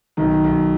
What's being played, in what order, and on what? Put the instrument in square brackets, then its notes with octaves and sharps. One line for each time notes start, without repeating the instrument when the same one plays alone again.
[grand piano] B1 [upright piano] D#3
[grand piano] B1